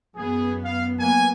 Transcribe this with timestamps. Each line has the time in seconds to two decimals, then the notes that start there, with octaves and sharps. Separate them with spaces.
0.16 F#2 B3 G#4
0.65 F5
0.99 F#3 A#3 B3 G#5